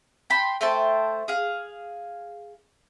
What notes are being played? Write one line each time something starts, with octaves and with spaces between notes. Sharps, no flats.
G5 A5 B5 C6
A3 C5 G5 A5
G#4 F5